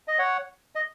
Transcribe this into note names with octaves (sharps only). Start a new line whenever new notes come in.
D#5
C#5 F#5
D#5